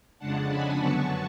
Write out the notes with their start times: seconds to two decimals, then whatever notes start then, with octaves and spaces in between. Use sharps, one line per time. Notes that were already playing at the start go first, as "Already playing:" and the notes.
0.19 F2 C#3 G#3 D4 F#5 A5
0.49 G#5 B5
0.78 F#2 D3 F#3 B3 A5 C#6